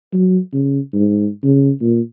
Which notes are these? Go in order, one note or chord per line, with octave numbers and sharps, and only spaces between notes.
F#3
C#3
G#2
C#3
A#2